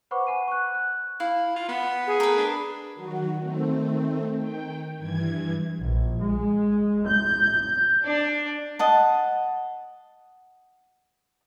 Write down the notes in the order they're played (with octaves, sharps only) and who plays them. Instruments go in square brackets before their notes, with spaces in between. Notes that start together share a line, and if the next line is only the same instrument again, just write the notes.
[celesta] B4 C5 F#5 B5 C#6 D6
F#5 G#5 D#7
C#6 F#6
F#6
[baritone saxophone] E4 [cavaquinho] F5
[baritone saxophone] F4
B3
[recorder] G#4
[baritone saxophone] A3 [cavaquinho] A#4 B4
[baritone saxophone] D4
[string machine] D#3 F#3 F#4
D#3 A3 C4
D#3 G5
G2 E3 G#6
[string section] A#1
G#3
G6
D4
[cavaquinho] D#5 F#5 A5